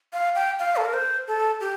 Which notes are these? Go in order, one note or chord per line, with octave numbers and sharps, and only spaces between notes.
F5
G5
F5
A4
A#4
C5
A4
G4